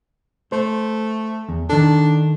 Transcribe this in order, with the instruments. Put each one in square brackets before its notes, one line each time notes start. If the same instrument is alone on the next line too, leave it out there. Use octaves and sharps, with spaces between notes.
[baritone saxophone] A3 [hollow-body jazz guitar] C5
[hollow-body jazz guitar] E2
[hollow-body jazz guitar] D#3 A4 [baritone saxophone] D4